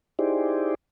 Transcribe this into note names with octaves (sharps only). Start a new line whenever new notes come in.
D#4 E4 G4 G#4 C5 D5